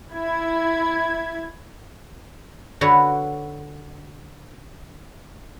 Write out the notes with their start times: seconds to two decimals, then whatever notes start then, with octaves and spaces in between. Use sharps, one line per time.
0.15 E4 G#6
2.81 D3 F#4 B4 C#5